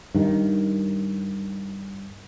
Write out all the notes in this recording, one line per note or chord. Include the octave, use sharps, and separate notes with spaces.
G2 D#3